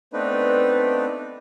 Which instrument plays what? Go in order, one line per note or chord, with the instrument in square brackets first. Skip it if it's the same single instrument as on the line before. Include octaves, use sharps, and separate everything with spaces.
[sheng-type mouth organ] A3 B3 C4 D4 D#4 B4